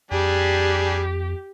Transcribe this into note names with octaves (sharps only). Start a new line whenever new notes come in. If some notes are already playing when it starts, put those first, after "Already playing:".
F2 G3 D4 G4 G#4